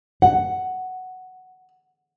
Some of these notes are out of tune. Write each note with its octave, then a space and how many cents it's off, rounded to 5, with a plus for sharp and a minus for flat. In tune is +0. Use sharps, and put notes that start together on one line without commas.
F#5 +5